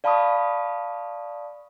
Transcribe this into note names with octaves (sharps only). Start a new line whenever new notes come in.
D5 F5 A5 B5 C#6 D#6